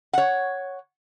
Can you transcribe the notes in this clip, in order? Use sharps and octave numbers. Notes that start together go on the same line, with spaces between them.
C#5 F#5